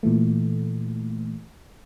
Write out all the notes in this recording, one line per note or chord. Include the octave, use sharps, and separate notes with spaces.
A#2 E3 A3